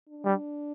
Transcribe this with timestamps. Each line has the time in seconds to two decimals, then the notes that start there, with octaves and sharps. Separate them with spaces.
0.09 D4
0.25 G3